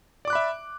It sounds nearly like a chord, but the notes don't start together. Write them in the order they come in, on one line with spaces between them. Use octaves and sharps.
D5 D6 F#6 B5 E5